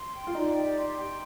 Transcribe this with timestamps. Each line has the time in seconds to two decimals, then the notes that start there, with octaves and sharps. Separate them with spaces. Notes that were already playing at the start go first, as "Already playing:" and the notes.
Already playing: C6
0.14 G5
0.27 F4
0.35 D#4 D5
0.55 G4
0.76 C6
0.96 G5